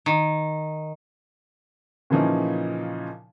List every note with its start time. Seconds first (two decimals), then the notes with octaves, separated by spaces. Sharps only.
0.06 D#3
2.10 A#2 C#3 E3 F3 C#4 D#4